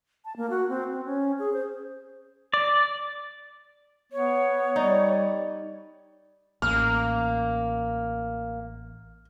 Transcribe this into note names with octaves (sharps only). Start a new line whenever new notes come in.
A5
A#3
F#4
C4
C4
C#4
G#4
C5
D5
B3 C#5
G3 D#4 D5
A1 A#3 F6